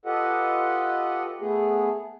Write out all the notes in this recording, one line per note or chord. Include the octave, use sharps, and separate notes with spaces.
F4 G4 A4 B4 D#5 F#5
A3 B3 G#4